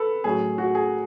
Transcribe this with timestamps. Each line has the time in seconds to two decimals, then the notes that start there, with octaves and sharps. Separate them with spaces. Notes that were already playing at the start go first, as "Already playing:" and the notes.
Already playing: A4 B4
0.24 A2 F#3 C#4 G#4
0.58 F#4
0.75 G#4